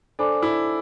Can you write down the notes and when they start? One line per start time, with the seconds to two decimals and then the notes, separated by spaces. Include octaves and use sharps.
0.19 D4 A4 C5 G#5 B5 D6
0.43 E4